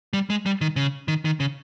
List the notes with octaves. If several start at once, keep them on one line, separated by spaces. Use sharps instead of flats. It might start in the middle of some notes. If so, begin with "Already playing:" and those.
G3
G#3
G3
D#3
C#3
D#3
D#3
C#3